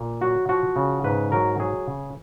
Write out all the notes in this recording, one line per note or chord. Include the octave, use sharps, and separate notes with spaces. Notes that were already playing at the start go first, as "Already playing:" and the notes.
Already playing: A#2
F#3 F#4
F3 F#4
C#3
G#2 B4
F#3 A#4
F#3 G#4
C#3